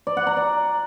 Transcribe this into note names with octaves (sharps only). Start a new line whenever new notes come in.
D5
F#5
A#5
D5